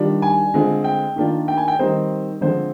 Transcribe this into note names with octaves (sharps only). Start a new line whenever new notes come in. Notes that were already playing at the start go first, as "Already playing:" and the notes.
Already playing: D#3 G3 D4 F4
G#5
D3 G#3 C4 F4
G5
D#3 A#3 D4 F4
G5
G#5
G5
D#3 G3 C4 D#4 C5
D3 F3 G#3 C4 F4 C5